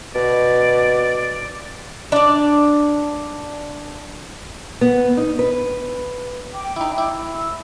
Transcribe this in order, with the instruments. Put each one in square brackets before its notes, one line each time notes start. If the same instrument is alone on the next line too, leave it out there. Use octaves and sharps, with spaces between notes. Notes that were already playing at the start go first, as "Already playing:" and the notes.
[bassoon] B2 [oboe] D5
[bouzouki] D4 D5
[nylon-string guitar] B3
D#4
B4
[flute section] G5 D6
[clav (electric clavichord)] D#4 E4
E4
[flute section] E6